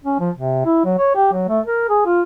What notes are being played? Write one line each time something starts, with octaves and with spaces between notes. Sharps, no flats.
C#4
F3
C3
E4
F#3
C#5
G4
F#3
A3
A#4
G#4
F4